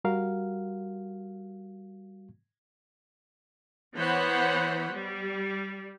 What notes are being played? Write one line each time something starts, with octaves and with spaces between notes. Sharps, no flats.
G3 F#4 A#4 F5
E3 B3 C5 C#5 F#5 B5
G3